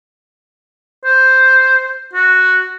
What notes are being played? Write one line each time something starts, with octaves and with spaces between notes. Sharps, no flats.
C5
F#4